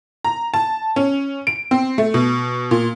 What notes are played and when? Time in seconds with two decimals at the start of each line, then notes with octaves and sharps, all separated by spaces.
0.25 A#5
0.54 A5
0.96 C#4
1.47 D7
1.71 C4
1.98 A3
2.14 B2
2.71 A#2